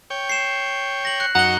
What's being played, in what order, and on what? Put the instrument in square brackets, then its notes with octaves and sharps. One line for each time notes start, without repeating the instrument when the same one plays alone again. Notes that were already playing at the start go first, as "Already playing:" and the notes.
[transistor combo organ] C#5 G5
[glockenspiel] C7 E7
A#6 F#7
F#6 C#7
[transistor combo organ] F#2 D#4 F#4 [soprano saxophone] F#5 [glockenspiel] A#5 G7